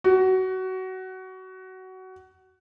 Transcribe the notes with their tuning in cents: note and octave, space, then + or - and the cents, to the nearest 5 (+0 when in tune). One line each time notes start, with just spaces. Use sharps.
F#4 +20